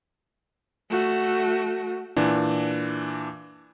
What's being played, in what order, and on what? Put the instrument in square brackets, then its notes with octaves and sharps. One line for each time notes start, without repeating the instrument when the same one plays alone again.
[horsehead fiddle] A3 F#4
[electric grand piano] A#2 E3 D4